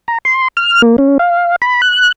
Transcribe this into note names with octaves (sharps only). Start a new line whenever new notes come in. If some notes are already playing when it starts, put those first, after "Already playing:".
A#5
C6
F6
A#3
C#4
F5
B5
F#6